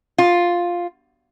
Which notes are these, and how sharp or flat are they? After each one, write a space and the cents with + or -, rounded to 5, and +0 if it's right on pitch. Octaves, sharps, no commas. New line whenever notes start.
F4 +5